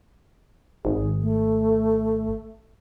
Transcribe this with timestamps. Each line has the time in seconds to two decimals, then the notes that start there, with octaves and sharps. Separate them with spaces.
0.85 G#1 G#4
1.19 A3